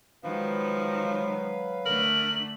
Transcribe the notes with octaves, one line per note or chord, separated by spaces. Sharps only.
D#3 F3 F#3 G#3 B4 F5
D3 A3 A#4 F#7